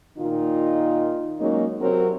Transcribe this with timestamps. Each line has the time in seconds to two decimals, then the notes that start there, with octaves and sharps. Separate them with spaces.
0.18 A#2 D#3 D#4 F4
1.40 F#3 G#3 A#3 C#4 D#4
1.81 C3 F#3 C4 F#4 A#4